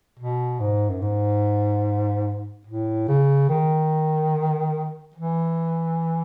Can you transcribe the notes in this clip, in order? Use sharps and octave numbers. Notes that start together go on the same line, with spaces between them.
B2
G#2
F#2
G#2
A2
C#3
D#3
E3